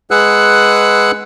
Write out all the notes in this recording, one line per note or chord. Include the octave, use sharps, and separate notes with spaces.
G#3 G#4 B4 F#5 E6 F#6